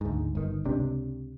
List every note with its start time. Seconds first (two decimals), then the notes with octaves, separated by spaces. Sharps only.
0.01 D2 G#2
0.35 G1 D#3
0.65 C#2 C3 D4